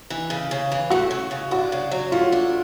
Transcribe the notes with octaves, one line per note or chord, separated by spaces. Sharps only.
E3
C#3
C#3
E3
A3 F#4
C#3
C#3
D4 F#4
C#3
F#3
A3 F4
D4